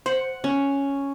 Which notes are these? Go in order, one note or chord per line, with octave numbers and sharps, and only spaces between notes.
C5 F#5
C#4